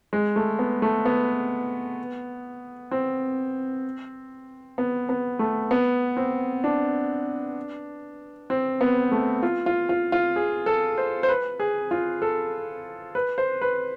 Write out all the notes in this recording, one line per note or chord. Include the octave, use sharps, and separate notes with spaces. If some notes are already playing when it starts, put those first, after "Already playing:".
G#3
A3
B3
A3
B3
C4
B3
B3
A3
B3
C4
D4
C4
B3
A3
F4
F4
F4
F4
G#4
A4
C5
C5
B4
G#4
F4
A4
B4
C5
B4